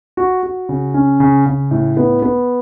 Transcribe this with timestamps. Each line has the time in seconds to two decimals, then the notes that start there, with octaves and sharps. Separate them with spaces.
0.17 F#4
0.43 F#4
0.69 C#3
0.94 C#4
1.20 C#3
1.46 C#3
1.71 A2
1.97 B3
2.22 B3